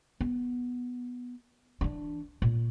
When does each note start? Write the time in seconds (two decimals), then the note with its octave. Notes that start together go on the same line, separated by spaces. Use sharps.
0.20 B3
1.81 E3 D4
2.42 A#2